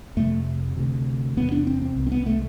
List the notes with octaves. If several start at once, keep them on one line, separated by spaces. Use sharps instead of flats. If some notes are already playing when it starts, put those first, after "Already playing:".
F2 C3 A3
D2 C3
E2 C3 B3
D4
C4
C4
C2 B2
C4
B3
A3